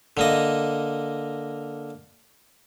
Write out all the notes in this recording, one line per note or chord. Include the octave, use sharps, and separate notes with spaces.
D3 A#3 D#5